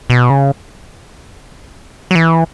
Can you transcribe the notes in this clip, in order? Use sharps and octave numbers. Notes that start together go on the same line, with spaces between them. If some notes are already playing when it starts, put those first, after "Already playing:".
B2
C#3
F#3
E3